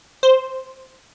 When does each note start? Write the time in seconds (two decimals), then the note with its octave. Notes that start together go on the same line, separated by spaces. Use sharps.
0.23 C5